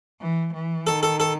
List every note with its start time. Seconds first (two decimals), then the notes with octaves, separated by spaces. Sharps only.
0.21 E3
0.54 E3
0.87 D#3 A4
1.03 A4
1.20 A4